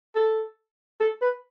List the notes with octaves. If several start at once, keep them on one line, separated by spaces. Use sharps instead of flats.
A4
A4
B4